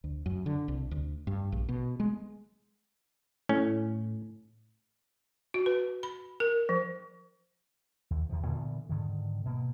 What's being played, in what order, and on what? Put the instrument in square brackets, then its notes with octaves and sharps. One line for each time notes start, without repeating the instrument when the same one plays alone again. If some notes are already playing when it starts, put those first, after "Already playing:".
[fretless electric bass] D2
F#2
D3
C2
D2
G2
A#1
B2
G#3
[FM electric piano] A2 [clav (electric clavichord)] C#4
[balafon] F#4
B4
B5
A#4
F3
[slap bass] D#2
E2 D#3 F3
A#2 D3 E3 B3
G#2 D3 D#3
B2 A#3